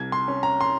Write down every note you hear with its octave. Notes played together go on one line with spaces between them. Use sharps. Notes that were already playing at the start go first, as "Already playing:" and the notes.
Already playing: C2 G#6
C6
C#4
A#5
C6